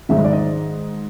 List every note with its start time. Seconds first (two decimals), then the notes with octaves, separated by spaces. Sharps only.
0.09 G#2 D#3 E5
0.17 D#5
0.24 D5
0.33 D#5